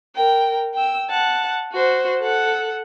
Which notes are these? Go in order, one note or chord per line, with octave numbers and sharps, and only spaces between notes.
A#4 G5
G5 E6
F#5 A5
F#4 C5
A4 F#5